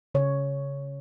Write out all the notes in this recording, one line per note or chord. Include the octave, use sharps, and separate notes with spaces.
C#3 C#5